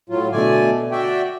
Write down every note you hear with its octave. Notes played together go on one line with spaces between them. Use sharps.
A2 F#3 F4
B2 D3 A3 D5 G#5
F#4 D5 E5 G5